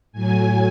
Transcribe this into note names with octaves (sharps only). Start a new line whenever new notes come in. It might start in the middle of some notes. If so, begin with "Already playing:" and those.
A2 F#3 G#5